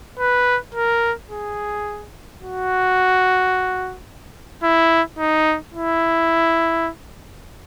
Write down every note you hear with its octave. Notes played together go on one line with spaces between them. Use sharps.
B4
A#4
G#4
F#4
E4
D#4
E4